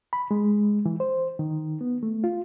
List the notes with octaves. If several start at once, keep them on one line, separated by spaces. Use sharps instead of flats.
B5
G#3
E3
C5
D#3
B3
A3
F4